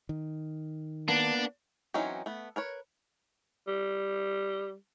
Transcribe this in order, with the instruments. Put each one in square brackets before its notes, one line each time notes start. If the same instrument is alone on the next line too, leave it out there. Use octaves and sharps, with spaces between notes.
[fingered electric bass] D#3
[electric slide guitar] A#3 B3 [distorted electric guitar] D4
[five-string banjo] E3 F#3 C4 C#4 D#4
A3 B3
A#4 B4 C#5
[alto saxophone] G3